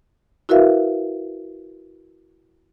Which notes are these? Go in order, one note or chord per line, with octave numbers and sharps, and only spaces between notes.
E4 F#4 A#4 B4 E5 F5